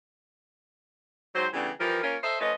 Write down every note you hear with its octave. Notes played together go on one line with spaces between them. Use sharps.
G#2 F#3 C4 C5
C#3 E3 G3 A3 B3 D4
E3 F3 G3 A#4
A#3 C#4 F4 A#4 C#5
A4 C5 D#5 E5
F3 A3 C#4 B4 D#5